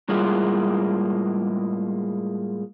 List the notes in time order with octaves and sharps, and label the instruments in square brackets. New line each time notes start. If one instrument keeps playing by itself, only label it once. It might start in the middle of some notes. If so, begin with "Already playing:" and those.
[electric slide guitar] A2 G3 G#3 A#3 E4 F4